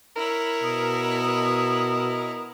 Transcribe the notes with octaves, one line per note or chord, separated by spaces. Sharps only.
E4 A#4 C#5
B2 D#6